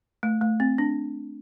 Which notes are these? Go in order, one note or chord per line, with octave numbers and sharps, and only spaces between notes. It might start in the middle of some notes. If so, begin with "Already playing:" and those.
A3
A3
C4
D4